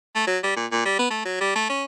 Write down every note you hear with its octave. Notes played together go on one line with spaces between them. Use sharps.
A3
F#3
G3
A#2
A#2
G3
B3
A3
F#3
G3
A3
C#4